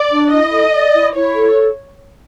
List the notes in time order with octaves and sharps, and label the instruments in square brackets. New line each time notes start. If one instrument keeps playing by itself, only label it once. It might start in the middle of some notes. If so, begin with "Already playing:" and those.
Already playing: [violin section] D5
[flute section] D4
[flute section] E4 [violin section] D#5
[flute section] A4
D5
E4
[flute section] E4 [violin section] C#5
[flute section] A4